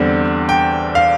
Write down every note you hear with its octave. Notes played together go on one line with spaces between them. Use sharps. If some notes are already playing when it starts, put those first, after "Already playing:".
Already playing: E2 D3 G3 C4
G5
F5